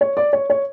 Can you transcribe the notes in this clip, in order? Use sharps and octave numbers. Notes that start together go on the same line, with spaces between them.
C#5
D5
C#5
C#5